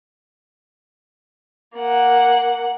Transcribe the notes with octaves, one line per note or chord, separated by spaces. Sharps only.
A#3 F#5